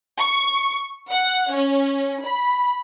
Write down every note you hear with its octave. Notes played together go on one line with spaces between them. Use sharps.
C#6
F#5
C#4
B5